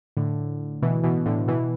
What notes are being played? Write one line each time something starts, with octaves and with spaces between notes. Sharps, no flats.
A2 D3
B2 E3
B2 E3
A2 D3
B2 E3